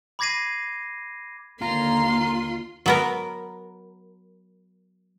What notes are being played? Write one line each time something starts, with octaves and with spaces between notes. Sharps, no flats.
B5 D6 G#6 A#6 C7 D#7
D#2 D3 A#3 F4 A#5 C6
F#3 B3 A#4